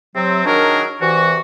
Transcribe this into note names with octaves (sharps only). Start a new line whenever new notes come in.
C3 F#3 C4
D#3 F#3 D4 F#4 G#4 A#4
C2 C3 E3 F#4